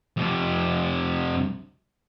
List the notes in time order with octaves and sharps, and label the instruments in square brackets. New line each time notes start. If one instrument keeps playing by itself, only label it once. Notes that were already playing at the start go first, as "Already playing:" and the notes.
[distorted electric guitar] F2 C3